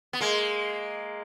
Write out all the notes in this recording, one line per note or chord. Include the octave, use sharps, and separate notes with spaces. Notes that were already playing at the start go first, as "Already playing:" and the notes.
B3
G#3 A#3